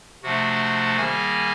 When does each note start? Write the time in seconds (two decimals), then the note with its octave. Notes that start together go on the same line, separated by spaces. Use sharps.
0.23 C3 F3 A3 D4 F#4 F#5
0.97 D#3 G3 A#3 G#4 G#5